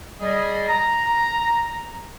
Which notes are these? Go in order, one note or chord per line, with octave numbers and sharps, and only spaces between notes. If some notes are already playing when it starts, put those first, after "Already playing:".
G3 G#4 D#5
A#5